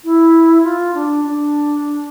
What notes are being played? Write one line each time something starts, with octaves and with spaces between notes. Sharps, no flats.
E4
F4
D4
D4